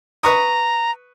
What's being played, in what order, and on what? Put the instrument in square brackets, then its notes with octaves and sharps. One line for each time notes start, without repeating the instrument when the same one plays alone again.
[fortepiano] B4 C#6 D#6 [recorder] A#5